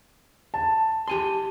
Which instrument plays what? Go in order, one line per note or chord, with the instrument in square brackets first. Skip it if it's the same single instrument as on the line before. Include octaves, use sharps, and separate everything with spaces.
[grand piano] A5
[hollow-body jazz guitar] G4 G#5 C6 [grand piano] A5